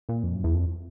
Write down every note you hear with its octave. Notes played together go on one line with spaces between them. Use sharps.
A#2
F2
F#2
E2
F2